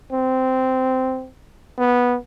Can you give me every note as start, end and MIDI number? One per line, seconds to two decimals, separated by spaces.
0.12 1.26 60
1.78 2.16 59